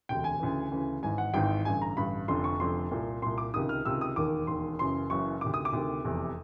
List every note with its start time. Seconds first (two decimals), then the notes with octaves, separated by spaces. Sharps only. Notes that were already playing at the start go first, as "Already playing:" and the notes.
0.09 E1 D2 C3 G5
0.24 G#5
0.39 D2 C#3 E3
0.71 D2 C#3 E3
1.02 G#1 G#2 E3 G#5
1.18 F#5
1.34 G#1 G#2 E3 G5
1.65 A1 G2 D3 G#5
1.82 A#5
1.97 A1 G2 D3 B5
2.28 F1 F2 D3 C6
2.44 C#6
2.60 F1 F2 D3 C6
2.91 C2 A#2
3.22 C2 A#2 C6
3.38 D6
3.54 C#2 C3 D#3 D#6
3.69 F6
3.85 C#2 C3 D#3 E6
4.01 D#6
4.16 E1 D#2 D#3 D6
4.47 E1 D#2 D#3 C6
4.79 F#1 F#2 C#3 E3 C6
5.10 F#1 F#2 C#3 E3 C#6
5.41 D2 C3 D#3 D6
5.54 D#6
5.65 D6
5.73 D2 C3 D#3
6.04 F1 E2 C3